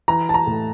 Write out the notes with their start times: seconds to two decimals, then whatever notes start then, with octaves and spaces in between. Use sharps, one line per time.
0.08 E3 A#5
0.29 A5
0.34 A#5
0.47 A2